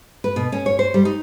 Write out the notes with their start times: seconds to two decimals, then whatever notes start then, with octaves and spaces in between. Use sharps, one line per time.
0.24 B4
0.36 B2
0.52 C#4
0.66 C#5
0.79 C5
0.94 G3
1.05 D#4